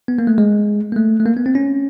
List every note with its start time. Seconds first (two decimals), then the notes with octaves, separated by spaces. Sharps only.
0.08 B3
0.19 A#3
0.27 A3
0.38 G#3
0.92 A#3
0.96 A3
1.20 A3
1.26 A#3
1.37 B3
1.46 C4
1.55 C#4